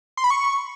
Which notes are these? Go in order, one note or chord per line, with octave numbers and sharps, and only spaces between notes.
C6
B5
C#6